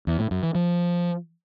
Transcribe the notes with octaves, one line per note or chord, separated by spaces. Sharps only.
E2
A2
F#2
E3
F3